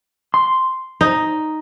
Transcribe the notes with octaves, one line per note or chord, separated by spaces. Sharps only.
C6
D#4